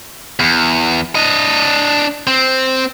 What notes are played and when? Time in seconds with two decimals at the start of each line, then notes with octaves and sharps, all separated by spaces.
0.40 E2
1.15 D4 D#5
2.27 C4